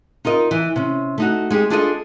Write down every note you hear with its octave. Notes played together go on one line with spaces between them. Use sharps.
D#4 F4 A#4 D#5
E3
C3 C#4
A3 D#4 F#4
G#3 D#4 G4 G#4
D4 F4 G#4 A4 C#5 D#5